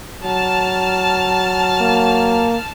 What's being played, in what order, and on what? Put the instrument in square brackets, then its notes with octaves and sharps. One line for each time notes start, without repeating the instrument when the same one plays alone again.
[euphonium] F#3 [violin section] A5 F6
[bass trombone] A#3